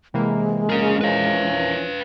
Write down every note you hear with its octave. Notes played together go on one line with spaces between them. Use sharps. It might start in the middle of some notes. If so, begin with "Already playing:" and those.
C3 E3 G#3 A#3
A#1 F#2 A#3 C#4 G#4 A#4
E3 F3 C#4 B4 F5